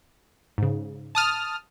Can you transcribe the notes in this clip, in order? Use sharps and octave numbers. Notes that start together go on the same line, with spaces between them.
G#2 C#3
A5 D#6 F6